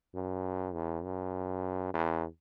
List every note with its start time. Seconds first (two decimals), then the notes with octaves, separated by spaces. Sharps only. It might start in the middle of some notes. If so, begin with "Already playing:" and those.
0.15 F#2
0.74 E2
1.04 F#2
1.94 E2